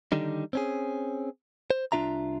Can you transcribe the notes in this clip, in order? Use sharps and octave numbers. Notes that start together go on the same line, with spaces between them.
D3 D#3 G3 D#4
C4 C#4 G#4
C5
C2 F#3 D4 F4 E5 A#5